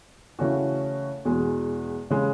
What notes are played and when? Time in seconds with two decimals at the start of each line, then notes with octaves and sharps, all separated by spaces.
0.39 C#3 E3 A3 C#4 F#4
1.25 E2 B2 G#3
2.10 C#3 G#3